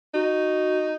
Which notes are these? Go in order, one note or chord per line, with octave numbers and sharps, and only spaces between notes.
D#4 F#4